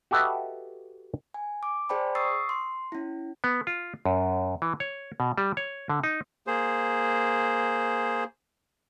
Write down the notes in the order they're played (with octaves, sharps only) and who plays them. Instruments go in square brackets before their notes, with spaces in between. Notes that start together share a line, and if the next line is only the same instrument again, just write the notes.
[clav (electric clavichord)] F#4 G4 A4 B4 D#5 E5
[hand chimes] G#5
D6
G#4 C5 D5 G5 A5 B5
C#6 D#6 E6 A6 C7
C6
C#4 E4
[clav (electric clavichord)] B3
F4
F#2
E3
C#5
B2
G3
C#5
D3
D#4
[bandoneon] A#3 G#4 C5